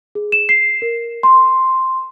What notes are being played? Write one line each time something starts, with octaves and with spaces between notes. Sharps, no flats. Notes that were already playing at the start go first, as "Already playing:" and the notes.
G#4
E7
C7
A#4
C6